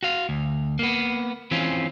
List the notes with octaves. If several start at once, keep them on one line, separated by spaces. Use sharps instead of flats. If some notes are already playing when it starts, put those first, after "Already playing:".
F#4 F5
D2
A#3 B3
E3 C4 C#4 F4